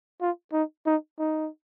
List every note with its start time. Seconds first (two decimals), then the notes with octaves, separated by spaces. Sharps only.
0.21 F4
0.53 D#4
0.86 D#4
1.19 D#4